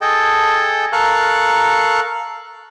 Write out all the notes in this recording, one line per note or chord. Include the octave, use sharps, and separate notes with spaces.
G#4 A4 D#5 G5 A5
A4 A#4 F5 C#6 F#6